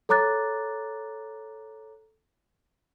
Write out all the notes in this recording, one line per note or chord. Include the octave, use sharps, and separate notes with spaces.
A4 C#5 A#5 D6 F#6 A6